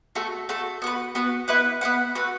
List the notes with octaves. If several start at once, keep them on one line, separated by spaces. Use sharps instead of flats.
A3 F#4 A4
A3 F#4 A4
B3 F#4 B4
B3 F#4 B4
B3 E4 B4 F#5
B3 E4 B4 F#5
A3 F#4 B4